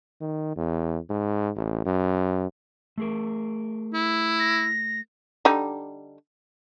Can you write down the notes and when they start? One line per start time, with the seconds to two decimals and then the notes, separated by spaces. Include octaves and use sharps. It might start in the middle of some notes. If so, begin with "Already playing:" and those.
0.21 D#3
0.57 E2
1.10 G#2
1.56 A1
1.86 F#2
2.98 A3 G#4 A#4
3.94 E4
4.40 A#6
5.45 D3 G3 D#4